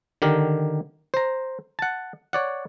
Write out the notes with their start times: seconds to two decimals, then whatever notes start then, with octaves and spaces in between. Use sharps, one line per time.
0.22 D3 D#3 G4 A#4
1.14 C5 A#5
1.79 F#5 A5
2.33 C#5 D5 F#5